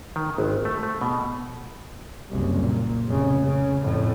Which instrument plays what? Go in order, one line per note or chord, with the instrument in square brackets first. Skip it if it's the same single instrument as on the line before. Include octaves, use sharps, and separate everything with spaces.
[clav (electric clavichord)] D#3
G#1
A3
A3
B2
[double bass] F#1 C2
A#2
F1 C#3
C#3
F2 A2